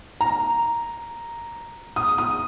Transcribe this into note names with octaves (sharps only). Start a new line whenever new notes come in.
A#5
D#6
D#6